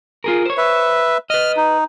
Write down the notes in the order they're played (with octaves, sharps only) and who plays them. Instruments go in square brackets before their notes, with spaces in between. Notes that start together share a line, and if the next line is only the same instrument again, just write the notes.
[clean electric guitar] F4 G#4 A#4
C5 C#5
[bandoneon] B4 E5
[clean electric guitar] B4 D#5 [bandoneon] F6
[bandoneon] D#4